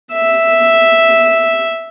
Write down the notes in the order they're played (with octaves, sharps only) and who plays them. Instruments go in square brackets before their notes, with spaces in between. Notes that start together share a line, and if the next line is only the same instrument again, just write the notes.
[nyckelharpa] E5